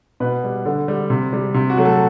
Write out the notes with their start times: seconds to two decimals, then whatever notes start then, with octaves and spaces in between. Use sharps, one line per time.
0.20 B2 B4
0.44 G3
0.66 D3
0.88 G3
1.10 C3
1.33 G3
1.54 C3
1.70 F#4
1.77 F#3 A3
1.85 A4